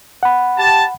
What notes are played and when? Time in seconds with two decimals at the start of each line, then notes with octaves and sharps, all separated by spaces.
0.23 F#5 B5
0.58 G4 A5